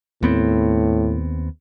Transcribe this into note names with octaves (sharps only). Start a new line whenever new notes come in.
D#2 A2 B3 C4